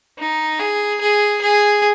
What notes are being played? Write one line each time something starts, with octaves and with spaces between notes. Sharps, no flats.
D#4
G#4
G#4
G#4